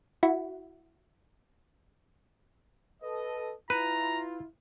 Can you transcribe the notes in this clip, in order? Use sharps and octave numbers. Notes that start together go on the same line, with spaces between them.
E4 F#4
A4 B4 D#5
E4 F4 B4 A#5